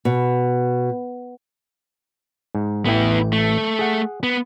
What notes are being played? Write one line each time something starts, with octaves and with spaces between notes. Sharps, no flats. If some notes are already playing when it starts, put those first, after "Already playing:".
B2
G#2
A1 E3 B3 E4 G5
A3
G#4 F#5
B3